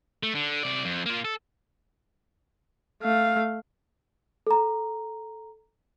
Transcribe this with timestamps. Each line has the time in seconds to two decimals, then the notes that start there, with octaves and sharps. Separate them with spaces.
0.23 A3
0.35 D3
0.63 C3 D5
0.85 F2
1.06 A#3 F4
1.25 A4
3.03 A3 F5
4.47 A4 A#5